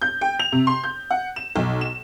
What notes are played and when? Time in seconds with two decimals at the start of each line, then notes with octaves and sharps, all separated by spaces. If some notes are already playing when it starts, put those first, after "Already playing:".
0.02 G6
0.21 G5
0.39 F7
0.52 C3
0.67 C6
0.84 G6
1.11 F#5
1.36 E7
1.56 B1
1.81 E7